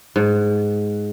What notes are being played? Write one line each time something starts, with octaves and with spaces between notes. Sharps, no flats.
G#2